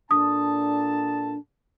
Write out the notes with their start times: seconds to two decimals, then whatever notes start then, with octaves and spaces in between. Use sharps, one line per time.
0.11 A#2 D4 A4 A5 D#6